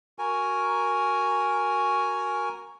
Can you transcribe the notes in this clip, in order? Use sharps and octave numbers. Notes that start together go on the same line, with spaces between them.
F#4 A#4 G#5